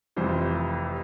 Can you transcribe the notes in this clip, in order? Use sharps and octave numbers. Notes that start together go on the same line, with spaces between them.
F1 F2 C3 E3 C5